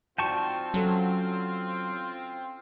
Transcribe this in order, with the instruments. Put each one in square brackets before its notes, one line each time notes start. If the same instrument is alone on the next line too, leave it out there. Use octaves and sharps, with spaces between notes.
[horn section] C4 F4 [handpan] D#4 F#4 D5 [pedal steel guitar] G5 A5 C#6
[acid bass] F#3 [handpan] C#4 A4